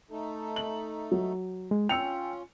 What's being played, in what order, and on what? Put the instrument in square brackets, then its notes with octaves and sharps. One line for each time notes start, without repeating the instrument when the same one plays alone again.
[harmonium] A3 D#4 A4
[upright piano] F#7
F#3
[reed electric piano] G#3
[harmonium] C#4 F4 [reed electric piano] G5 [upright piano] E6 C#7 F7